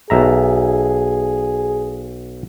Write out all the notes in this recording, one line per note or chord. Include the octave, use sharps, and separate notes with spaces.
B1 G#4 E5 A#5